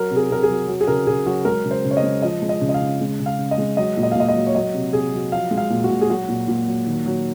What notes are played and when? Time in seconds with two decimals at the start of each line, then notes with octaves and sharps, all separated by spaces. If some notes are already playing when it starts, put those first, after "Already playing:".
Already playing: F#3 A#4
0.11 C3
0.16 G#4
0.30 C3 A#4
0.43 G#4
0.49 F#3
0.68 F#3
0.81 G#4
0.88 C#3 A#4
1.07 C#3 G#4
1.26 F#3 F#4
1.45 G#3 A#4
1.65 C#3
1.71 C5
1.85 C#3
1.91 C#5
1.97 D#5
2.03 G#3
2.22 F3 D#5
2.42 G#3
2.49 D#5
2.61 C#3
2.69 D#5
2.74 F5
2.81 C#3
3.01 G#3
3.20 C#3
3.26 F5
3.38 C#3
3.51 D#5
3.58 G#3
3.77 F#3 D#5
3.97 A#2
4.03 D#5
4.12 F5
4.16 A#2 D#5
4.28 D#5
4.35 F#3
4.47 C#5
4.55 F#3 D#5
4.74 C3
4.93 C3 G#4
5.13 F#3
5.32 F3 F5
5.51 G#3
5.58 F5
5.70 A#2
5.84 F#4
5.90 A#2
6.01 G#4
6.10 F#3 F#4
6.29 A#2
6.48 A#2
6.67 F#3
6.87 D#3
7.06 F#3